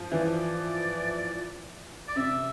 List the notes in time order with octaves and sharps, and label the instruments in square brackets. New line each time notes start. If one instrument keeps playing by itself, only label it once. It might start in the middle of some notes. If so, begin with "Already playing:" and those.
Already playing: [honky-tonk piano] F3
[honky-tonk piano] E3 [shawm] D5
[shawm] D5
[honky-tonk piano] C3 [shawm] E5